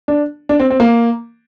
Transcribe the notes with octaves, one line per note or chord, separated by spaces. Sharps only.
D4
D4
C4
C4
A#3